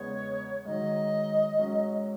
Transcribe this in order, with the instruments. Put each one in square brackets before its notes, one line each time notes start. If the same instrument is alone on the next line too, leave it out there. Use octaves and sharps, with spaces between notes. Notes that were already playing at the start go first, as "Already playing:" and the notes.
Already playing: [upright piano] E2 C#3 G#3 B3 [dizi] C#5
[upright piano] G#2 D#3 F#3 [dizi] D#5
[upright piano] G#2 F#3 C#4